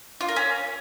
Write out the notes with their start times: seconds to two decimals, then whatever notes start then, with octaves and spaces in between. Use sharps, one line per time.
0.21 F4
0.28 A#4
0.36 C#4